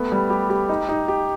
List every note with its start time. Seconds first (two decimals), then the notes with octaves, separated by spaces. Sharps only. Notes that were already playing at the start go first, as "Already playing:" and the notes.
Already playing: A3 B3
0.12 G3
0.30 G4
0.50 G4
0.69 D#4
0.89 D#4
1.08 G4